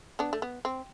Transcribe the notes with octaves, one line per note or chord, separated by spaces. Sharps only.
B3 D4
A3
B3
C4